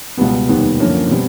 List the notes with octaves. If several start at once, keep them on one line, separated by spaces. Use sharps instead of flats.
C#2 B2 G3 B3
F1 D#2 D#3 G3 B3
F#2 D3 F3 A#3 C#4
B2 G3 C4